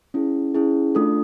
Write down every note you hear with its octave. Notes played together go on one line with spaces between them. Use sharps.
C#4 E4 G#4
C#4 E4 G#4
A3 D4 F4 A4 D#6